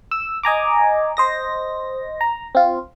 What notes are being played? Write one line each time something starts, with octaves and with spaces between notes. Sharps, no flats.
E6
D#5 G#5 A#5 D6
C5 D#5 A#6
A#5
C4 F4